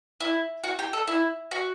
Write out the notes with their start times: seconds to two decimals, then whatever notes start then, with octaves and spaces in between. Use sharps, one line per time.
0.20 E4
0.64 F#4
0.79 G4
0.93 A4
1.07 E4
1.51 F#4